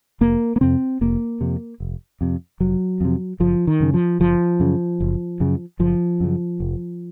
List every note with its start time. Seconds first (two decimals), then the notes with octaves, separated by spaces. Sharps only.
0.21 F1 A#3
0.56 A#3
0.61 F2 C3 C4
1.01 F1 A#3
1.41 F2 C3
1.80 F1
2.21 F2 C3
2.60 F1 F#3
3.01 F2 C3
3.40 F#1 F3
3.67 D#3
3.80 F#2 C#3
3.94 F3
4.20 F#1 F3
4.60 F#2 C#3
5.00 F#1
5.40 F#2 C#3
5.79 F#1 F3
6.20 F#2 C#3
6.60 F1